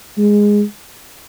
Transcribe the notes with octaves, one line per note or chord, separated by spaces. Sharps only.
G#3